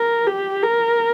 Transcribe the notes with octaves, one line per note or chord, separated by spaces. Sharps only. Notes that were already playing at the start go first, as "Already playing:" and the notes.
Already playing: A#4
G4
A#4